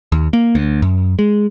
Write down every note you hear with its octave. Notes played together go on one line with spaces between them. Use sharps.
D#2
A#3
D2
F#2
G#3